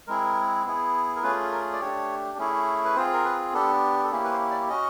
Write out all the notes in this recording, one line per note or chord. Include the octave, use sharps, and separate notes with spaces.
G#3 C4 E4 G#4 A#4
B3 E4 G#4
A#4
A3 C#4 F4 G#4 B4
A#4
D5
A3 D4 G4 C#5
A3 C#4 E4 G#4
B4
C4 F4 G#4 C5
A#4
B4
B3 D4 G4 A4
A4
A#3 C#4 E4 G4 G#4
B4
C5
D5
C#4 F#4 D#5